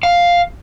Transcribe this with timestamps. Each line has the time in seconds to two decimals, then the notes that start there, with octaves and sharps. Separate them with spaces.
0.03 F5